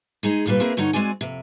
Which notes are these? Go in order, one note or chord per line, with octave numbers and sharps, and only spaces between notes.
G#3 D#4 G#4
D2 G2 A#2 G3 B4
A#3 C4 E4 G#4 A#4 B4
G2 D3 D#4 C#5 F#5
G#3 C4 F#4 D5 G#5
F2 C3